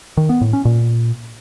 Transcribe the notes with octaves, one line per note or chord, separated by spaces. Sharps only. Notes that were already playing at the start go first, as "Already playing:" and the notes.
D#3
B3
A2
C#4
A#2